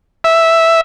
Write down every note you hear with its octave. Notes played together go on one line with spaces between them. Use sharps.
E5